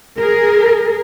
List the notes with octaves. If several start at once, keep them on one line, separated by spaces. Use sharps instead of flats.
G#4 A#4